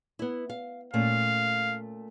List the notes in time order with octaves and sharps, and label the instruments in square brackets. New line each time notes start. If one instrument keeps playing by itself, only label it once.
[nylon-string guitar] B3 E4
F5
[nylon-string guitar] A#2 A3 C#4 [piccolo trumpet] F5